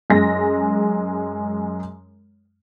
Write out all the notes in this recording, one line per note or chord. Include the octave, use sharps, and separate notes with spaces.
F#2 G#3 A#6